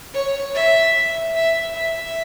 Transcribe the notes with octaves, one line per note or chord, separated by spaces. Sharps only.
C#5
E5
E5
E5